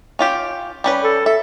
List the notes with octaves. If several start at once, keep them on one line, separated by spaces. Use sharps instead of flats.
C#4 F4 G4
G3 C#4 B4
A4
A4 E5